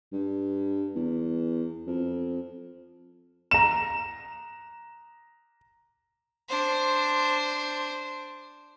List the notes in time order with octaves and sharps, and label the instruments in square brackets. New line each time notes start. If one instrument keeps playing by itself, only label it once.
[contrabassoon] G2
E2
F2
[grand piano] A#5 E7
[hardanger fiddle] D4 C5